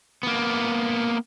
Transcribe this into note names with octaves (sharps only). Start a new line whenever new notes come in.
A#3 B3